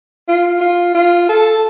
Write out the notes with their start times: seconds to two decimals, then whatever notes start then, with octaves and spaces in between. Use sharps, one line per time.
0.28 F4
0.61 F4
0.94 F4
1.29 A4